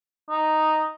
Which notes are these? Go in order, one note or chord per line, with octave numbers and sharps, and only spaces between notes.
D#4